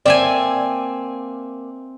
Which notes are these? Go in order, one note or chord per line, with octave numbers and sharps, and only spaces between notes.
A#3 C4 D5 E5 G#5